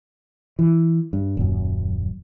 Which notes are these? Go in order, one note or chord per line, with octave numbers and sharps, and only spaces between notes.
E3
G2
D#1 F#2